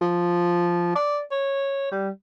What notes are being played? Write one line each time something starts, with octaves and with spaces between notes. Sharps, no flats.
F3
D5
C#5
G3